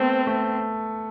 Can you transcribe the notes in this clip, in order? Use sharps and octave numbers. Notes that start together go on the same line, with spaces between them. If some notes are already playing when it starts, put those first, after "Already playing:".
Already playing: A3 B3 C4
A3